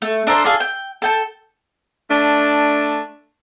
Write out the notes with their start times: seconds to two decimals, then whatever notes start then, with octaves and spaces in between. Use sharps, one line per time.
0.02 A3
0.27 D4 A4 A#4 C5
0.45 F4 G#4 A4 D5
0.60 G5
1.02 A4 G5 A5
2.11 A3 D4